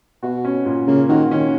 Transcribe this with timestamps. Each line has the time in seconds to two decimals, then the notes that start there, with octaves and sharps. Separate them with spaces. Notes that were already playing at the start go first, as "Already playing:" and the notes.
0.23 B2 F#4
0.45 C#4
0.66 A#2
0.87 C#3 A#3
1.09 D#3 F#4
1.31 D#3 C#4